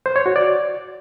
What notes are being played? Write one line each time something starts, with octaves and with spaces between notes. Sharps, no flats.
C5
C#5
F#4
D5